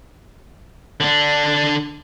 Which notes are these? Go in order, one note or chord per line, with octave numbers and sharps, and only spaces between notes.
D3 D4